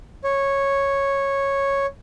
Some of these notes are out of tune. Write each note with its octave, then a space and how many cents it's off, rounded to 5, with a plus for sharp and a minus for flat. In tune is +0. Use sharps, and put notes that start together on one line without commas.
C#5 -5